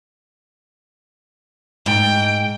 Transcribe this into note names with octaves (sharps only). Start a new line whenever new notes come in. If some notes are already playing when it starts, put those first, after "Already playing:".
G#2 G5